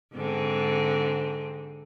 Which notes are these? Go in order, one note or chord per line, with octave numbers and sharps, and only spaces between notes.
G#2 D3 C4